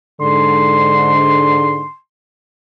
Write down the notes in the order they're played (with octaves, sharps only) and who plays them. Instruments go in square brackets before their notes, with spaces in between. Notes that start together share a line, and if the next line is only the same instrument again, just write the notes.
[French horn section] G#2 D3 [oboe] C6